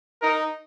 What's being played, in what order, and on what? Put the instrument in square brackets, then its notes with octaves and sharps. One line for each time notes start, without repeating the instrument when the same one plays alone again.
[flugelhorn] D#4 [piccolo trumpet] A#4